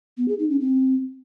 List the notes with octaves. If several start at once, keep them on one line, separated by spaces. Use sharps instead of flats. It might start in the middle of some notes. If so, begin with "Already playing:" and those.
B3
G#4
D#4
C#4
C4